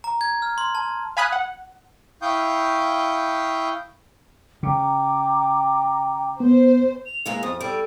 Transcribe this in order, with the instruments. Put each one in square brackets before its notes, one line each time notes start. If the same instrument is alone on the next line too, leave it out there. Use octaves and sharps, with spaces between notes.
[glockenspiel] A#5
G#6
F6
C6
A5
[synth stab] F5 G#5 B5 D#6 F#6
F#5
[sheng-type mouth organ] E4 F5 G5 C#6 D#6 G6
[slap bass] C#3 [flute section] G5 A#5 D6
[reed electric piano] B3 [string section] C5
[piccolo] F7
[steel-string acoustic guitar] E3 G#3 A#3 [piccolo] F7
[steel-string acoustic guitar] F2 [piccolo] D#6
[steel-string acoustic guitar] G3 [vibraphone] G4 A4 E6 [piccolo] D7